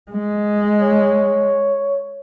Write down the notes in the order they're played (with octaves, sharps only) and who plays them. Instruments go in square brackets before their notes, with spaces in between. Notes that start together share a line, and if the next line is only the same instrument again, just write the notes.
[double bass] G#3
[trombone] C#5